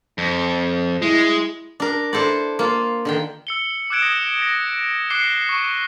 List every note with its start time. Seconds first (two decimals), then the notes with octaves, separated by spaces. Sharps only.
0.18 F2
1.02 G#3 E4
1.80 D4 A#4
2.13 D4 E4 A4 C5 D5
2.59 A#3 F4
3.05 D3 D#3 G5
3.47 E6 C#7 G7
3.90 D6 E6 F#6 G#6 D7 E7
4.02 D#6 A#6 C#7
4.42 A#6
5.10 D6 F#6 C7 C#7 G7
5.49 C#6